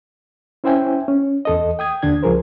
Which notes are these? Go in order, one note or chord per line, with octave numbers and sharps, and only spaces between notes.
C#4 E4 C5 E5 G5 G#5
C#4
E2 A4 D#5
G5 D#6 G#6
D#2 D3 D4 G#6
C#2 F3 G#4 A#4 C5